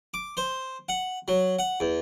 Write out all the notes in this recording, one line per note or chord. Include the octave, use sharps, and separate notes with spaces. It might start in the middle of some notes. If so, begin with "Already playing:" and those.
D6
C5
F#5
F#3
F#5
E2